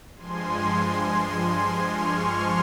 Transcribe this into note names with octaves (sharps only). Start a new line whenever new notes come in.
G2 F3 G#3 G#5 C6
C#6 F6